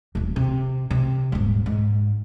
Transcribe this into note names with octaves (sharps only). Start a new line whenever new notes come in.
D#1 E3
C3
C3
D#1 G#2
G#2